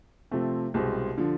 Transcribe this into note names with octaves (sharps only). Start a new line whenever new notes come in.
C3 F3 A3 C4
C2 B2 G#3 C4
D3 F3